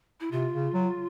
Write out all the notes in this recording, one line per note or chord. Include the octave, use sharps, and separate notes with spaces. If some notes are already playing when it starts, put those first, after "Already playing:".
E4
C3 F4
C#3
F#3